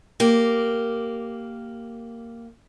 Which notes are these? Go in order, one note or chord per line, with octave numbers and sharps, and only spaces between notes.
A#3 G4